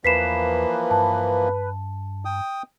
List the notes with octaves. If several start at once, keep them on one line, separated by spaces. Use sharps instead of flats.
E2 E3 F3 A#3 B4 B6 C7 E7
G2 A5
G5 D#6